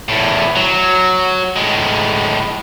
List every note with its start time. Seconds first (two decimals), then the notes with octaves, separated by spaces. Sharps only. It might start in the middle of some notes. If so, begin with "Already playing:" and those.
0.09 E2 A2
0.56 F#3
1.56 A2 G#3